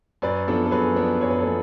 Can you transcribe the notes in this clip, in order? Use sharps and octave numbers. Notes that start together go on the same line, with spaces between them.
F#2 B4 D5
F3 B3 D4 A4
A4
F#2 G#4 B4
F3 B3 D4
F#2 C#5
B4
A4 C#5
F3 B3